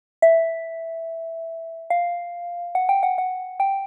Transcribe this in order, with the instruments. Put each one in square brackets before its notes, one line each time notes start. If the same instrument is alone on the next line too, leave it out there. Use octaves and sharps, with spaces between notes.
[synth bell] E5
F5
F#5
G5
F#5
F#5
G5